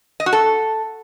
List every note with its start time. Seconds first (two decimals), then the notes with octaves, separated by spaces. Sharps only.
0.20 D#5
0.26 F#4
0.33 A4